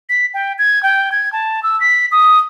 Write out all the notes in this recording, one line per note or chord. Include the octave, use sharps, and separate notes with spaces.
B6
G5
G#6
G5
G#6
A5
E6
B6
D#6